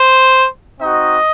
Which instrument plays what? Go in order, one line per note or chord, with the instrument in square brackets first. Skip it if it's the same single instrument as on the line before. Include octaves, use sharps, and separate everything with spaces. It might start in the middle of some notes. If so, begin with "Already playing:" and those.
Already playing: [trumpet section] C5
C4 D#4 F#4 D#5